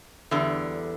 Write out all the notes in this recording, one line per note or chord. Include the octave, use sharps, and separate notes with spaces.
E2 D3 G3